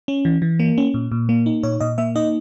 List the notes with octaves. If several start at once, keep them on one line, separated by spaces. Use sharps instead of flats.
C#4
E3
E3
A#3
C#4
A#2
A#2
A#3
D#4
A#2 C#5
A#2 D#5
A#3 E5
D#4 D#5